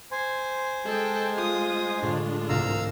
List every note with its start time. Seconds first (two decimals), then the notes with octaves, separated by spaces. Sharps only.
0.12 C5 G#5 C6
0.85 G#3 A4 G5
1.34 F4 D#6
2.02 A2 D3 D4 F4
2.49 C2 G#2 E3 F5 A#5 E6